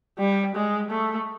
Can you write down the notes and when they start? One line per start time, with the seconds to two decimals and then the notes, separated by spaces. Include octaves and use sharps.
0.19 G3
0.56 G#3
0.91 A3